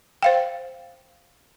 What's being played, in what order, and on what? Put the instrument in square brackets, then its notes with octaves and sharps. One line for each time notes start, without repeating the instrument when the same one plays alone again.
[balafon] C5 F5 G5